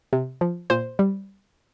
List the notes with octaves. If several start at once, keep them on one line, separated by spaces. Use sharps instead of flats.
C3
F3
A#2 C5
G3